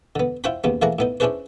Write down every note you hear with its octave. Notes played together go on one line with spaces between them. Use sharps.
D3 B3
E4 F4 C5 F#5 G5 B5
D#2 C#3 B3
E3 A3 A#3 G#4 F#5 A#5
A2 B3 D#4
C#4 D4 E4 G#4 B4 C5